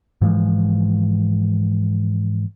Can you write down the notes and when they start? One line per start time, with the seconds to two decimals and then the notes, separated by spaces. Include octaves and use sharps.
0.21 G#2 E3 F3 G#3